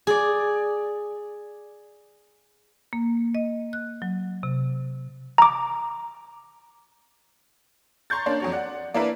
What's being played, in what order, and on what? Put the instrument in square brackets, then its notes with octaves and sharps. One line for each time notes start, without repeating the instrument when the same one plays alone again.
[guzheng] G#4 D5
[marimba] A#3
D#5
F#6
F#3
C3
[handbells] A#5 D6
[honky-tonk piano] A#5 C6 C#6 G6 A6
A#3 C#4 D4
F2 F#3 C#5
D5 F#5
A#3 D4 E4 A#4 B4 D5